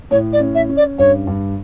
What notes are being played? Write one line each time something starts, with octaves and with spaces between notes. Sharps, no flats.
A2 C#5
D5
C#4
E5
C#4
D5
G2 C#5
G2